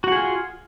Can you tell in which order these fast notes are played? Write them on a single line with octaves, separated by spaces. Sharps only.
F#4 F#5 G#4 F4